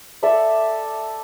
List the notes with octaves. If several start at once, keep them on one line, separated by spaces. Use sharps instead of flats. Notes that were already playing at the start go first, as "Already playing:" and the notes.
A4 D5 E5 B5